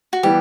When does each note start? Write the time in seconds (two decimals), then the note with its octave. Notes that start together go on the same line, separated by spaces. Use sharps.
0.13 F#4
0.23 E3 G3 B3 G4